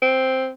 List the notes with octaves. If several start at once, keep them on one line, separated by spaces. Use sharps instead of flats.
C4